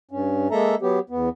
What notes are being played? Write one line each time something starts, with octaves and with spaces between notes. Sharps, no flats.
G2 C#4
G#3 A#3 A4 E5 A#5
F#3 B3 G4
E2 B3